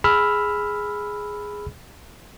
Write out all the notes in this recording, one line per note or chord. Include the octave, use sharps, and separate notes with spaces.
G#4 B5 E6 F6